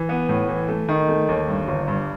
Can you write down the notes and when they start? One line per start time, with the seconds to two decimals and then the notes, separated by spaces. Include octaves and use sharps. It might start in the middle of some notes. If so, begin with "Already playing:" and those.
Already playing: E3
0.09 B3
0.29 A2
0.49 E3
0.69 A3
0.89 D#3
1.08 A3
1.29 D#2
1.48 G2
1.68 G1
1.88 G2